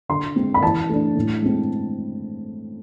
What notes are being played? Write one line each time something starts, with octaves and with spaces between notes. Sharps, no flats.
D3 C6
G#3 C4
B5
E3 A5
A3 D4
A2
G#3 C4